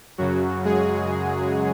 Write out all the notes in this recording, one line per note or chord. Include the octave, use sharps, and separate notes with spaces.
F#2 C#3 F#3 F#4
G#3 G#4